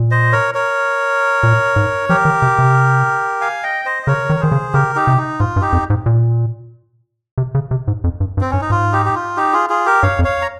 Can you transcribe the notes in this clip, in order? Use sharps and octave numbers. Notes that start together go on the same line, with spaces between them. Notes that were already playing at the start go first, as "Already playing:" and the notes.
Already playing: A#2
C5 D#5
A#4 C#5
A#4 C#5
A#2
G#2
F3 G4 A#4
D#3
C3
C3
F5 G#5
D#5 G5
C5 D#5
D#5
C#3 A#4 C#5
D#3
A#4
D#3 G#4 C5
C#3
C#3 G4 A#4
D#4 G4
C3
D#4
G#2 F4
G2
D#4 G4
F2
G#2
A#2
C3
C#3
C3
G#2
F2
G2
G2
C4
G2 C#4
D#4
G#2 F4
D#4 G4
G4
F4
D#4 G4
F4 G#4
F4 G#4
G4 A#4
G2 C#5 F5
F2
C#5 F5
A#5